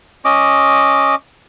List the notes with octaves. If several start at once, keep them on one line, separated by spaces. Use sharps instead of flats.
C#4 D#5 D6